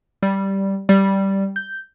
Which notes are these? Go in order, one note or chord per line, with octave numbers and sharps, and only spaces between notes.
G3
G3
G6